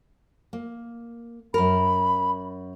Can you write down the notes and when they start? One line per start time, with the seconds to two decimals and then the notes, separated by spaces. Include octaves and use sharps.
0.53 A#3
1.54 F#2 A#4 B5